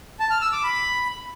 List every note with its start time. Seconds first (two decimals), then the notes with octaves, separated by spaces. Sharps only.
0.20 A5
0.31 F6
0.42 E6
0.52 D6
0.63 B5